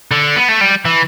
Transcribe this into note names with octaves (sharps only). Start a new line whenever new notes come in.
D3
B3
A3
G3
E3